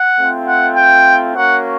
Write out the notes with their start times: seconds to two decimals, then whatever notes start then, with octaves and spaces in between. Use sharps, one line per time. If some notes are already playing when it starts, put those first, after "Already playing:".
Already playing: F#5
0.17 A3 C4 F4
0.46 F#5
0.76 G5
1.35 A#3 C#4 F#4 F#5